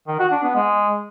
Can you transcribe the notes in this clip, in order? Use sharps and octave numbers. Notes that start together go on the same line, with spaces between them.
D#3
F#4
D4
B3
G#3